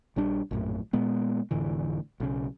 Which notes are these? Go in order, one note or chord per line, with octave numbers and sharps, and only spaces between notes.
A#1 G3 D4
A#1 F#2 A2
A#2 G#3 B3
F1 A2 D3 E3
B1 C#3